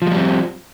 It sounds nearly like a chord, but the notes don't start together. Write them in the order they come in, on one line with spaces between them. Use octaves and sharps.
F3 G#3 G3 C4